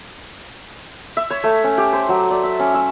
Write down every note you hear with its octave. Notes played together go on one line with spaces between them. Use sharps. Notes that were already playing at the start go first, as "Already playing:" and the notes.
E5
C#5
A3
C#4
G4
C5
F#3
D5
E5
C#4
E5